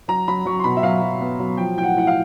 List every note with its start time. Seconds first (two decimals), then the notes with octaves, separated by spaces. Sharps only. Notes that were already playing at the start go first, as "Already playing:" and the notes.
0.08 F#3 A#5
0.28 F#3 B5
0.45 F#3 C#6
0.59 C6
0.64 B2 B5
0.76 E5
0.83 F#3 F5
1.02 F#3
1.21 B3
1.39 F#3
1.57 F3 G5
1.76 A2 G5
1.83 F#5
1.95 A2 F#5
2.07 F5